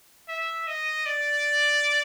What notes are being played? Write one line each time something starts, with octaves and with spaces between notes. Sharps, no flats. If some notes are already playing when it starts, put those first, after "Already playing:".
E5
D#5
D5